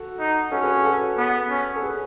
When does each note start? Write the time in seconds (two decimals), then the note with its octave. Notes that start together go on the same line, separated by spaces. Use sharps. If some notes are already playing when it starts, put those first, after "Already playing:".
Already playing: F#4 A4
0.20 D#4
0.51 C#4 F#4 A4
0.63 G#4 B4
0.74 G#4 B4
0.84 F#4 A4
1.17 B3
1.50 C#4
1.76 A4
1.82 G#4 B4